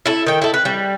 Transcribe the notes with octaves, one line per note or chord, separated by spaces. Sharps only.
E4 A4
D#3 G5
E4 A4
B4
G3